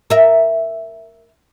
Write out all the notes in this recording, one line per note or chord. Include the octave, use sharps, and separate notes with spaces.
A#4 E5